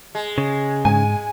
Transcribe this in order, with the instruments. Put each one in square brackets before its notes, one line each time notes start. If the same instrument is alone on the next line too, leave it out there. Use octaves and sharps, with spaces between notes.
[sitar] G#3
[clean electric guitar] C#3
[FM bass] G#2 [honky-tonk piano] G#5